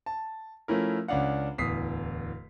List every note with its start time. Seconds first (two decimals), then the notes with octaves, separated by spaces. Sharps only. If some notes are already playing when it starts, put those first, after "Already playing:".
0.06 A5
0.68 F3 A3 C#4 E4 A#4
1.08 C#2 C#4 D4 F5 F#5
1.58 D1 E2 D#6 B6 C7